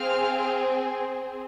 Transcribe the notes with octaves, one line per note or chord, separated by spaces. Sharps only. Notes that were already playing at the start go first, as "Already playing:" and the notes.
Already playing: C4 G#4 F5 F6